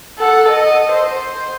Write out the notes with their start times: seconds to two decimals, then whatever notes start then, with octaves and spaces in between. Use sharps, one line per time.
0.19 A4 F#5
0.50 D#5
0.92 C5